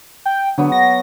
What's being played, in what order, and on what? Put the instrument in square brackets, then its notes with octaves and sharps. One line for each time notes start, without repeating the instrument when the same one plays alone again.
[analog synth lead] G5
[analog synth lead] D3 [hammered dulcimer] F#3 B3
[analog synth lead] A#6